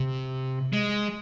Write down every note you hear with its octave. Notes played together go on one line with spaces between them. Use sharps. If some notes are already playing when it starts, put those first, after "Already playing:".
Already playing: C3
G#3